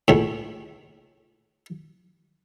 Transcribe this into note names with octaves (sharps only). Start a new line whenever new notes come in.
C#2 A2